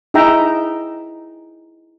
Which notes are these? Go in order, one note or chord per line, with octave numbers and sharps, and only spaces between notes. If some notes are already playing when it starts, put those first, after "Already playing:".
D#4 E4 G#4 E5 G5 A#5